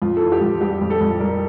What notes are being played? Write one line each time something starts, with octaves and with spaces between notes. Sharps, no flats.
F2 F4
E3 A4
G4
F2
G3 G4
F2
A4
F2
G3 A#4